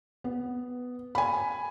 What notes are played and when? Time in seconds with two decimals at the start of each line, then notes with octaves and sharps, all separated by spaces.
0.24 B3
1.15 G#5 B5